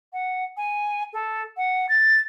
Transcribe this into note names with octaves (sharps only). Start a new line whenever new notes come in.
F#5
G#5
A4
F#5
A6